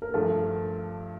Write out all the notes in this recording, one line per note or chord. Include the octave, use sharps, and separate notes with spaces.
A#4
G2 F3 A3 A4